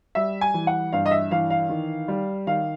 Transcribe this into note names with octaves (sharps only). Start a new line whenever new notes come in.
G3 E5
G#5
E3
F#5
G2 F5
D#5
E5
E3 F5
F5
D#3
G3
D#3 F5